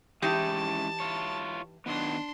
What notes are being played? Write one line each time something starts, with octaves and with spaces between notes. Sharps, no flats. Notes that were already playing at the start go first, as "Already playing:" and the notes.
E3 G#3 C#4 D#4 E4 G4 A5
E4 F4 C#5
D#3 F#3 B3 D4 C6